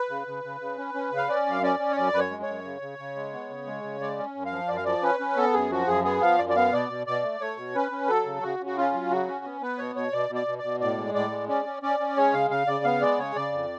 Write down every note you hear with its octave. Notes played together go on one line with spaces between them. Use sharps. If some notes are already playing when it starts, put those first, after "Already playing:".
Already playing: B4
C#3
C#3
C#3
C#3
C#4
C#4
C#3
F5
C#4 D5
F#2 F5
C#4 D5
C#4
C#5
F#2 D5
F#2 B4
C#5
G#3
C#5
F#2
C#3
C#3
C#3
G#3
B3
C#3
G#3
C#3
G#3 D5
C#4
F#2
F5
F3
F#2 D5
F5
F3 D5
C#4 B4
C#4
B3 A4
F#2 G#4
F3 F#4
F#2 G#4
B3 G#4
F3 F5
F#2 D5
D5
B3 F5
B2 D5
B2
B2 D5
A3
A3 C#5
B2
C#4 B4
C#4
F#3 A4
C#3
C#3 F#4
C#3
F#4
C#4 F4
F#3
C#3 F#4
C#4
B3
B3 B4
B2 C#5
B2 C#5
B2 D5
B2
D5
B2
D5
B2
A2 D5
G#3
A2 D5
G#3
C#4 D5
C#4
C#4 D5
C#4
G#3 C#5
C#3 F5
C#3 F5
C#3 D5
B3 F5
G#3 D5
C#3 C#5
C#3 D5
F2